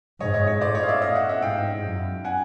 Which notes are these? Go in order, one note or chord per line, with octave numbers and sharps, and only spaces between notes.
G#2 C#5 D#5
C#5 D#5
C#5 D#5
A2 C5 D5
C#5 D#5
F5
D5 E5
A2 D#5 F5
E5 F#5
E5 F#5
G#2 F5 G5
F#2
F#5 G#5